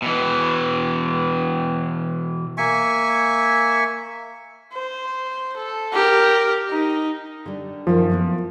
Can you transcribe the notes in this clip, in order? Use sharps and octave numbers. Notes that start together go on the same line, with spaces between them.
B2 E3
A#3 E5 G#5 C#6
C5
A4
G4 A#4
D#4
D3 G3
F#2 D#3 F3
A3 B3 E4